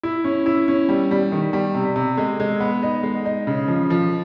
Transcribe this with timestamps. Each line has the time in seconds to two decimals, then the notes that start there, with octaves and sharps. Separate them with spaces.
0.03 E4
0.24 C#4
0.46 E4
0.68 C#4
0.89 G3
1.11 G3
1.32 D#3
1.53 G3
1.75 C3
1.96 C3
2.17 G#3
2.40 G#3
2.60 B3
2.83 D#4
3.03 G#3
3.25 D#4
3.47 C#3
3.68 F3
3.90 F3